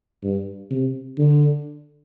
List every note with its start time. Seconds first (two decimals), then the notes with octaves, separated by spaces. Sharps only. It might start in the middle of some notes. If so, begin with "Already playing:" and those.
0.23 G2
0.71 C3
1.18 D3